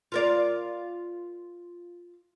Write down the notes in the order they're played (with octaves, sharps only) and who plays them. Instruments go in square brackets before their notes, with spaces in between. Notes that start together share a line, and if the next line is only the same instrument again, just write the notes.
[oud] F4 A#4 D5